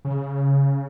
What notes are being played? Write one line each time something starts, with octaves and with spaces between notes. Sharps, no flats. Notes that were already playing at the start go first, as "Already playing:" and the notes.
C#3